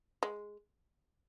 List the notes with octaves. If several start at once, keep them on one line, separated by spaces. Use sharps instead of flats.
G#3